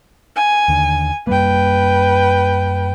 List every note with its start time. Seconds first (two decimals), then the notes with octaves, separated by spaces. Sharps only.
0.36 G#5
0.68 D#2 D3
1.27 F#2 G3 A#3 B4 G5